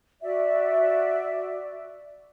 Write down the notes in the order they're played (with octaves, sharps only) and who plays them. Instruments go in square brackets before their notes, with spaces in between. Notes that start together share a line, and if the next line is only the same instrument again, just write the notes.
[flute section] F#4 D5 E5